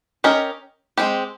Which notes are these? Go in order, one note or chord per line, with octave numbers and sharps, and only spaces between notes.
C#4 G4 A#4 D#5
G#3 C4 G4